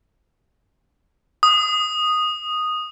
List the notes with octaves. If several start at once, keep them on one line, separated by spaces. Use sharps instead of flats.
D#6